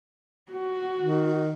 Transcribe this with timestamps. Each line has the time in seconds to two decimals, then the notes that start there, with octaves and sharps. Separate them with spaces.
0.51 F#4
0.99 D#3